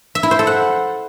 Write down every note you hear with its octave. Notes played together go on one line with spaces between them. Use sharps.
E5
E4
C5
A4
F#5